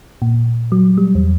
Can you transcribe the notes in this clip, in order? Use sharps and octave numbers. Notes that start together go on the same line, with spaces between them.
A#2
F#3
G3
E2